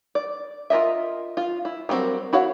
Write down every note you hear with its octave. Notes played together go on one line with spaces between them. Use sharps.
D5
F4 A#4 D#5 E5
F4
E4
F#3 G3 A#3 C4 A#4
E4 F#4 C#5 F5